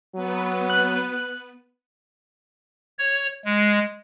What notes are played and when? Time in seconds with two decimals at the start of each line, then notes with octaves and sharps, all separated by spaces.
0.15 F#3 B3 B4
0.70 F#6
2.99 C#5
3.45 G#3